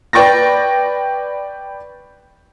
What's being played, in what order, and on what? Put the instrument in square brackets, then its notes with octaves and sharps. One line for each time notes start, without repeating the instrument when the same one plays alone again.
[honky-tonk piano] B4 D5 G5 C#6 A6 A#6